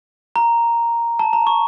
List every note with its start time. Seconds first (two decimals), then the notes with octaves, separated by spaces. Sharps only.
0.36 A#5
1.19 A5
1.33 A#5
1.47 C#6